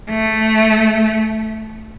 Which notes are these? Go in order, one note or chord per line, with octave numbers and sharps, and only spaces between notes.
A3